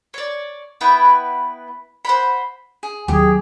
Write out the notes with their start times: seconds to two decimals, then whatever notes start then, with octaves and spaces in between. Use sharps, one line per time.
0.14 C#5 D5
0.81 B3 E4 B4 G5
2.05 C5 F#5 B5
2.83 G#4
3.08 D#2 F#3 G4 G#4